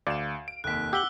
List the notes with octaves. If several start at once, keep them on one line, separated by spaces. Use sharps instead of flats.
D2 D5 F5 E7
D7
F1 D#2 F#6 B6
G4 F#5 D6 E6 B6 F#7 G7